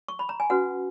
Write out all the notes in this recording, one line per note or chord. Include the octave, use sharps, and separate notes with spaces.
C#6
B5
A#5
G#5
C#4 F#4 B4 F#5